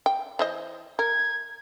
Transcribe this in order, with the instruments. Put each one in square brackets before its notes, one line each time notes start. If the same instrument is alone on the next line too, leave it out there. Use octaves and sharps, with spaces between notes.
[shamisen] G5
E3 C5 D#5
[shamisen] A#4 [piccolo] G#6